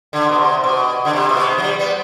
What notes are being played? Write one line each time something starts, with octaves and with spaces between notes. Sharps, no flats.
D3
B2
C3
B2
D3
C3
B2
C3
F#3
G3
B3